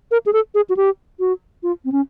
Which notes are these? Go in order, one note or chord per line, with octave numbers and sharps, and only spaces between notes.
A#4
G#4
A4
G#4
F#4
G4
F#4
F4
C4
C#4